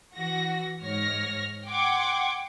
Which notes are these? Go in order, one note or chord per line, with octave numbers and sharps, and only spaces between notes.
E3 F#4 A#6
G#2 C#5 F6 A#6
F#5 G5 C6 D6 G#6